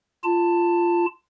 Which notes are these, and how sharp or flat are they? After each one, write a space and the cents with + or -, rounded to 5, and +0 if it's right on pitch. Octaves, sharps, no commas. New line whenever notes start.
F4 -15 A5 +15